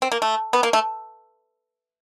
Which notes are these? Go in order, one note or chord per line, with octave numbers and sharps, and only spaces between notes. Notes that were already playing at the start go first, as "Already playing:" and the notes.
C4
A#3
A3
B3
A#3
A3